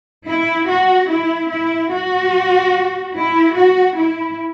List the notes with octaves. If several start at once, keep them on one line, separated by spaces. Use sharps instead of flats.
E4
F#4
E4
E4
F#4
E4
F#4
E4